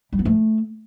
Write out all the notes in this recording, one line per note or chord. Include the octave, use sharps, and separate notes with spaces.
G3
B3
A3